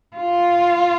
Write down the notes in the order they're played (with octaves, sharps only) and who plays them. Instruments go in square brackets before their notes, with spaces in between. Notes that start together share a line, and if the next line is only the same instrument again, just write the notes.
[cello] F4